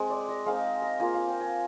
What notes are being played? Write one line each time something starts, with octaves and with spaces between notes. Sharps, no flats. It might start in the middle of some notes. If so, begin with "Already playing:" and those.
Already playing: G#3 C4
D5
D#5
G#3 C4 D#4 F5
A#5
A#3 F4 G#5
F5
G5
G#5